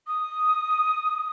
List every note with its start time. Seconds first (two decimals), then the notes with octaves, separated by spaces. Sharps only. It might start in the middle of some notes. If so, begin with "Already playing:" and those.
0.07 D#6